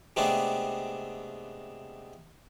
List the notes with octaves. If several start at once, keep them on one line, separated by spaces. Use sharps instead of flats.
C3 G#3 A3 B3 C4 D4